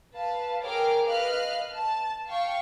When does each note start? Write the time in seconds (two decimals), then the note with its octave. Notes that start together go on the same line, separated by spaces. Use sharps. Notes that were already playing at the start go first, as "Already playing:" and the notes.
0.15 B4 F5 A5
0.63 G#4 A#4 C#5 G5 D6 F6
1.06 B4 D#5 F5 F6 F#6
1.75 A5
2.28 F5 G5 C#6